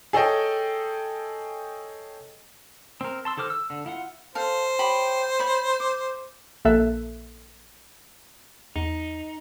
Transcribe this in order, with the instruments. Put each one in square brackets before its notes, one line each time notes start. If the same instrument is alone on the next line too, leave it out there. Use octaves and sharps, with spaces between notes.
[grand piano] G#4 A4 C#5 D#5 G5
[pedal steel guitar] C4 A#4
A5 C6 E6
D#3 A4 C5 D6 F6
E6
D3
E4 F4 F#5
[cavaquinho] A4 F5 [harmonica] C5
[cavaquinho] G4 C#5 B5
C#5 B5
D6
[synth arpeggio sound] A#1 A#3 A4 E5 F#6
[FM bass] E2 [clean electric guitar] D#4